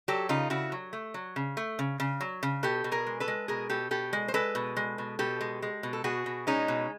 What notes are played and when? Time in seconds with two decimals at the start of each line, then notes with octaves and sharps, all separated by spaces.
0.08 F#3 G4 A4
0.29 C#3 D#4 F4
0.50 C#3 E4 F#4
0.72 F#3
0.93 A3
1.14 F#3
1.36 C#3
1.57 A3
1.79 C#3
2.00 C#3
2.21 F#3
2.43 C#3
2.63 B2 G4 A4
2.84 B2
2.92 G#4 A#4
3.07 G#3
3.20 A4 B4
3.28 G#3
3.48 B2 G#4 A#4
3.69 B2 G4 A4
3.91 B2 G4 A4
4.13 G#3
4.28 C5
4.34 G#3 A4 B4
4.55 B2
4.77 G#3
4.98 B2
5.19 B2 G4 A4
5.41 G#3
5.62 G#3
5.83 B2
5.93 A4
6.04 B2 F#4 G#4
6.26 B2
6.47 G#3 C#4 D#4
6.68 B2